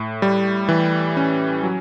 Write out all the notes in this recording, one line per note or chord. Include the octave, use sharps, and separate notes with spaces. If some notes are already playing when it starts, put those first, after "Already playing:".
Already playing: A2
G3
E3
C#4
F#3